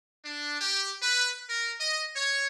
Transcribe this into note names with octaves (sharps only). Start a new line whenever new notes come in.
D4
G4
B4
A#4
D#5
C#5